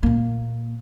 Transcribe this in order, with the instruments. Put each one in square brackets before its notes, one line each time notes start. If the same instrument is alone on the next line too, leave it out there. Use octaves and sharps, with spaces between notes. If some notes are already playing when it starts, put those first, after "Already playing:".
[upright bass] A#2 A#3